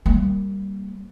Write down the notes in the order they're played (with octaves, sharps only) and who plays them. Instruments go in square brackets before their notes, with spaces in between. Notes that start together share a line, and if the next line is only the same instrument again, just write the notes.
[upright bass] G3 A#3